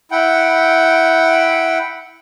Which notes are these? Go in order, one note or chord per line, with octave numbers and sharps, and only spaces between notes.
E4 F#5 G5